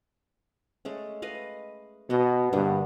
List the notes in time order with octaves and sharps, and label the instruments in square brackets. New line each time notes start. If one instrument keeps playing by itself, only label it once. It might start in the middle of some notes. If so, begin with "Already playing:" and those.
[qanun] G#3 A3 C#4
B4 D#5 F5
[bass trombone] B2 [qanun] B3 F#4 D#5
[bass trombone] G2 [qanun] D3 A#3 B3